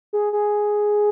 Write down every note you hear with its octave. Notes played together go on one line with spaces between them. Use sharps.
G#4
G#4